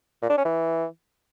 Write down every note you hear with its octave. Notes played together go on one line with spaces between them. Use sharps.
A#2
D4
C#4
E3